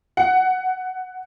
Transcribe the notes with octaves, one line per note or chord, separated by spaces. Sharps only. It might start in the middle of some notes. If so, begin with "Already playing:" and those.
F#5